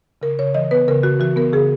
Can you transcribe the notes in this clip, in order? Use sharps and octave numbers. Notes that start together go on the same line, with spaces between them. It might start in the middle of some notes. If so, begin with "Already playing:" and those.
C#3 A#4
C#3 C#5
E3 D#5
B3 B4
C#3 A#4
C#3 F#4
E3 F#4
B3 A#4
C#3 G#4